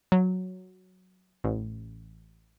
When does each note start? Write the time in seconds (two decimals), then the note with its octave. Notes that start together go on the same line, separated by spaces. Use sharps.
0.12 F#3
1.44 A1